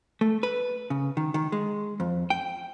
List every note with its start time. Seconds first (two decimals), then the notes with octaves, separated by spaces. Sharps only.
0.21 A3
0.43 B4
0.90 C#3
1.17 D#3
1.34 D#3
1.52 G#3
2.00 F2
2.30 G5